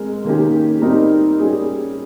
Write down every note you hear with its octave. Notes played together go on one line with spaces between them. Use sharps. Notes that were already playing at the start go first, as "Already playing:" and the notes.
Already playing: G#3 C4 A#4
D#3 A#3 C#4 G4
G3 C4 D#4 A#4
G3 C#4 G#4